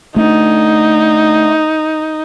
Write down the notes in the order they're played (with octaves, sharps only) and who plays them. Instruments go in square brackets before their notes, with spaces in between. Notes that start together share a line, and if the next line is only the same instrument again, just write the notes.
[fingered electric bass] A3 C4 D4 [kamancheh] D#4